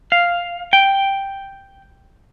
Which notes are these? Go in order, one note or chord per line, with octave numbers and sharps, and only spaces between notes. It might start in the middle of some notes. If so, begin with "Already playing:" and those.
F5
G5